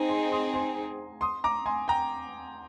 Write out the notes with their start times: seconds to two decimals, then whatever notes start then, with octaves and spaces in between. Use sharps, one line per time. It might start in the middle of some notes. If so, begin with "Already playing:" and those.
Already playing: C4 D#4 G#4 A#5
0.09 G#5 C6
0.32 C6 D#6
0.54 G#5 C6
1.21 C6 D#6
1.44 A#5 D6
1.66 G#5 C6
1.88 G5 A#5